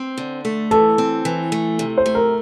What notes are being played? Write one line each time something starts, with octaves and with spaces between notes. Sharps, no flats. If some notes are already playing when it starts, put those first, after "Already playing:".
Already playing: C4
D3
A3
E3 A4
C4
E3
A3
C3
C5
A3
A#4